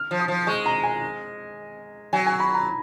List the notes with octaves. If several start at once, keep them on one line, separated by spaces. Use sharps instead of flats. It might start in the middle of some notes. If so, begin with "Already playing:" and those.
Already playing: F6
F3
D#6
F3
G#3 C#6
A#5
G#5
F#3 G#5
G#5
B5
A#5